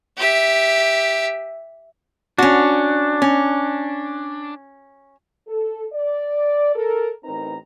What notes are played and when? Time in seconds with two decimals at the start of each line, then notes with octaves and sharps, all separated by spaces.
0.18 G4 E5
2.38 C#4 D4 F#4
3.22 C#4
5.47 A4
5.93 D5
6.75 A4 A#4
7.25 A1 C4 D#4 A#4 B4 A#5